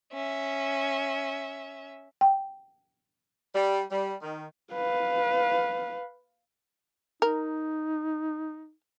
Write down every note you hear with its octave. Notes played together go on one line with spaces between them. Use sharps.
C#4 E5
G5
G3
G3
D#3
B4 F5
D#4 A#4